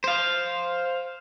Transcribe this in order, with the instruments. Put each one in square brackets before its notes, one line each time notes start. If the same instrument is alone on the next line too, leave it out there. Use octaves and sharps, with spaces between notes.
[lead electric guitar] C5 F5